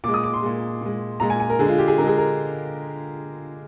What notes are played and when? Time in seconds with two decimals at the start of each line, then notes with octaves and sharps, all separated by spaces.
0.04 A#2 D6
0.08 G#3
0.14 D#6
0.24 D6
0.34 C6
0.43 A#2 G#3
0.81 A#2 G#3
1.20 A#2 G#3 A#5
1.30 G#5
1.40 G#5
1.50 A#4
1.59 D3 G#4
1.64 G#3 F4
1.78 G4
1.88 G#4
1.98 D3 G#3 A#4
2.07 G#4
2.18 A#4